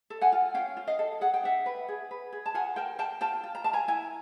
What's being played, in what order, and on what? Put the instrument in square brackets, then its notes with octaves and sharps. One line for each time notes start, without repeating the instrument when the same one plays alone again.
[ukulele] A4
F#5 G#5
F4
C#4 F5 G5
F4
D#5 F5
A4
G#4 F#5
G5
D4 E5 F#5
B4
G#4
B4
G#4
A5
F4 F#5 G#5
A#4 G5 A5
A#4 G5 A5
F4 G5 A5
F4
A#5
A#4 A5
G#5 A#5
E4 G#5 A#5